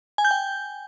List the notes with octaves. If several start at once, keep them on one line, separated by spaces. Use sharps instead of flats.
G#5
G6
G5